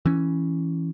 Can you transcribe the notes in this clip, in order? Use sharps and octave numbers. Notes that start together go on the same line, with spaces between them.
E3 C#4